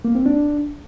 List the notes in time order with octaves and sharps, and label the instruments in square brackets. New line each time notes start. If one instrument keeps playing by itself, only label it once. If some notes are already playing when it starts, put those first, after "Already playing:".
[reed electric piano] A#3
C4
D4